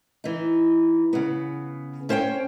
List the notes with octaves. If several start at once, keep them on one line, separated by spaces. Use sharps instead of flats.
E3 D#4
C#3 B3
C#4 C5 C#5 F5 G5